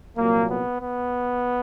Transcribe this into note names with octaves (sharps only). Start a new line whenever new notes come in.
C2 A#2 F#3 A#3
B3
B3